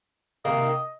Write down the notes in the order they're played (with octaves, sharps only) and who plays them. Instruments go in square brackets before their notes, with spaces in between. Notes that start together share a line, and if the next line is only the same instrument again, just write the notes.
[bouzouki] C3 D#3 A#3 [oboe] D#5